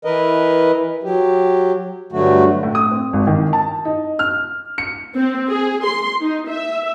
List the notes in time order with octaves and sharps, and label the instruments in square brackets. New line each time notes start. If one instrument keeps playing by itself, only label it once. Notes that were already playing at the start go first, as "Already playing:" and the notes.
[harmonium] E3 A#4 B4 D#5
F#3 G4
G2 D3 F#3 A3 F#4
[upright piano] A2
D#6
C4
G#1
D#3
A5
D#4
F6
C#7
[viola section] C4
G#4
C6
D#4
E5